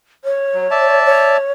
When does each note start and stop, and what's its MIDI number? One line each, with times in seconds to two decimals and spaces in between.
0.24 1.00 73
0.54 0.67 54
0.71 1.37 74
0.71 1.37 76
0.71 1.37 81
1.05 1.52 73